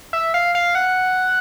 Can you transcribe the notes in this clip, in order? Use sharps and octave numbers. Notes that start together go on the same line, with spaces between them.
E5
F5
F5
F#5